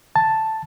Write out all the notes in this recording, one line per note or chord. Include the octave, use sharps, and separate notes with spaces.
A5